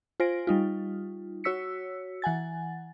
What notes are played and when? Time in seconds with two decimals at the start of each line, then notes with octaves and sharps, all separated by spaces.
0.20 F4 C5 G#5 A#6 D7
0.47 G3 D#4 F4
1.44 F#4 C#5 E6 B6 C#7
2.22 E3 F#5 G#5 A6